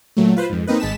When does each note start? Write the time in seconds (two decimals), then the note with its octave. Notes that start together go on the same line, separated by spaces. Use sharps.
0.17 A#2 F#3 A3
0.37 F4 B4 C5
0.50 F2 G#2
0.67 A#3 C4 D#4 B4
0.80 G#1 G#3 A5 B6 E7